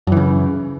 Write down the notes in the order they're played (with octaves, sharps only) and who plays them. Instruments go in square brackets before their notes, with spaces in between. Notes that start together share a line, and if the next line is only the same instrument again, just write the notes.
[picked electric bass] F#2
E3
C#3